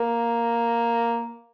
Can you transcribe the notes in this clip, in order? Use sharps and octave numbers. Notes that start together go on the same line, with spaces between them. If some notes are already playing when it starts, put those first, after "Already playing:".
Already playing: A#3